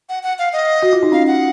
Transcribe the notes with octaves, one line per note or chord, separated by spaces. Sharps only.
F#5
F#5
F5
D#5
F#4
F4
D#4
C#4 F5
F#5